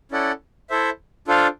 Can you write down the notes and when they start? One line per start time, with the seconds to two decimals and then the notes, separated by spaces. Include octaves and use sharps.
0.11 C#4 E4 A4 D5 F#5
0.70 E4 A4 C5 E5
1.28 D4 F4 A4 C5 F5